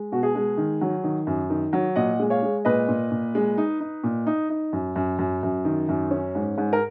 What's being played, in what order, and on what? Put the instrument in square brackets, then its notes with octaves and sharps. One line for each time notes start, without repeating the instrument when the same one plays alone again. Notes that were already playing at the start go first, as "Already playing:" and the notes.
Already playing: [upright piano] G#3
B2 F#4
G#4
G#3
D#3
F#3
D#3
F#2
D#3
F#3
A#2 D#5 F#5
G#3
C#5 F5
G#3
A#2 B4 D#5
A#2
A#2
G#3
D#4
D#4
A#2
D#4
D#4
F#2
F#2
F#2
F#2
D#3
F#2
C#4
G#2
G#2
A#4